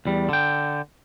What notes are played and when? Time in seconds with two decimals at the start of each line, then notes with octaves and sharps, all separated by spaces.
0.05 E2 G3
0.29 D3 G5